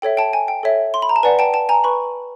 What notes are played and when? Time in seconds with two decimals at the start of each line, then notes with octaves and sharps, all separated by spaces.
0.02 A4 C#5 E5 G5
0.17 G5 A5
0.33 G#5
0.48 G5
0.63 A4 C#5 E5
0.94 C6
1.02 B5
1.09 A#5
1.16 A5
1.23 B4 D5 F#5 G#5
1.39 G5 A5
1.54 G5 A5
1.69 G#5 A#5
1.84 B4 B5 C#6